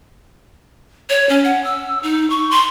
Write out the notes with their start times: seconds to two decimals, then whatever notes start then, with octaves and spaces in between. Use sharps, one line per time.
1.10 C#5
1.29 C#4
1.44 F#5
1.64 E6
2.03 D#4
2.30 C#6
2.51 C6